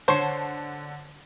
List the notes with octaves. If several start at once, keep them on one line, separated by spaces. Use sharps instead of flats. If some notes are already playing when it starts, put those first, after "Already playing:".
D3 C5 C#5 A5 C7